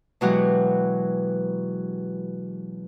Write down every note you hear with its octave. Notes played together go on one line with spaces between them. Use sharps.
B2 E3 F#3 G#3 F#4 G4